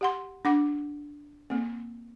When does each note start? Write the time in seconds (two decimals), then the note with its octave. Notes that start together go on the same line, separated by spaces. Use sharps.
0.01 G4 F#5 C6
0.45 D4 F#5 D6
1.50 A#3 C4